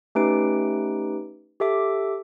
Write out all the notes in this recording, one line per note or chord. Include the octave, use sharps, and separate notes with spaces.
A3 C#4 D#4 G4 B4 D7
G4 A4 E5 D6